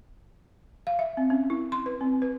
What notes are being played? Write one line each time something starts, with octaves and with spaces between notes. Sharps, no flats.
F5
E5
C4
C#4
E4
C6
B4
C4
B4